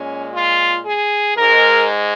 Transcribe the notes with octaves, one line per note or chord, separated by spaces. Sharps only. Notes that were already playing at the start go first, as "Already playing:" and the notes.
Already playing: A#2 G#3 C#4
F4
G#4
G#2 G#3 A#4